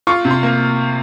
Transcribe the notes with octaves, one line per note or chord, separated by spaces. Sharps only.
F4 C#6
C3
C6
A#3